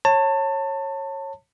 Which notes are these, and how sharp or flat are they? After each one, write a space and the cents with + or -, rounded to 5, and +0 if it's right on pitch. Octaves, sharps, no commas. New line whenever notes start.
C#5 -20 A5 +25